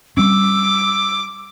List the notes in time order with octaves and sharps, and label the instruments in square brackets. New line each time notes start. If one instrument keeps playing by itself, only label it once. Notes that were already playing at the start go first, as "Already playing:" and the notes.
[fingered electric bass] G3 C4 C#4 [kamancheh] D6 [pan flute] E6